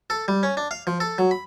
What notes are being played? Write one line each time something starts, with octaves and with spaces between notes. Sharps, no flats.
A4
G3
C#4
D4
F5
F3
A4
F#3
B5